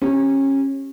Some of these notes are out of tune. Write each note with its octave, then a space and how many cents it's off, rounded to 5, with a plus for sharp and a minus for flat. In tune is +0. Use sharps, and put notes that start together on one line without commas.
C#4 -25 G4 +0